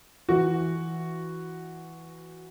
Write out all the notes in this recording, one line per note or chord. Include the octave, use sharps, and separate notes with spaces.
E3 F#4